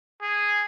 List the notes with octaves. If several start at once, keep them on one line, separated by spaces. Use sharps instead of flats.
G#4